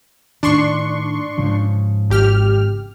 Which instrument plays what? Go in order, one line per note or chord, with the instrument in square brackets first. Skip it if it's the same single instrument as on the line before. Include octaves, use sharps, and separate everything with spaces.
[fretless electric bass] A2 D#3 [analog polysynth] D4 C6 C#6
[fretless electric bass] G#2 C#3 F3
[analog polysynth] G#1 G4 F6